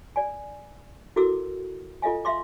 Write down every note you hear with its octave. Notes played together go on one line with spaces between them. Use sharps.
D5 G#5
E4 F#4 A4 A#4 D6 E6
F4 A4 D#5 F5 G#5
E5 F5 C6 D6